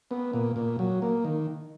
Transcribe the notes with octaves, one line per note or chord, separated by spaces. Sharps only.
B3
A#2
A#2
F#3
A#3
D#3